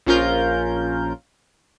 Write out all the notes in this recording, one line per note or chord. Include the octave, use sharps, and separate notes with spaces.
A#1 F3 C#4 F4 A#4 G6